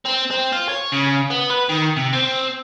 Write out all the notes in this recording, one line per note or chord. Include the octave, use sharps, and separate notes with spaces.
C4
C4
F4
C#5
C#3
B3
B4
D#3
C3
C4